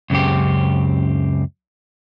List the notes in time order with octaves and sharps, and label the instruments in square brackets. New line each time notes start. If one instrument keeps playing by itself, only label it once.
[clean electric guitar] C#2 F#2 C#3 C4 G4